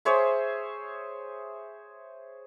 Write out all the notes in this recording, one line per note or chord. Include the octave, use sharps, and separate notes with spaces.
G#4 C5 C#5 E5